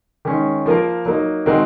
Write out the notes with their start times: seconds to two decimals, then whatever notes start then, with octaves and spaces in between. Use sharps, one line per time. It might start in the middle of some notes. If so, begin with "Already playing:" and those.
0.25 D#3 G#3 C#4
0.66 F3 A#3 F4 A#4
1.06 F#3 A#3 D#4
1.46 D#3 G#3 C4 F#4 A#4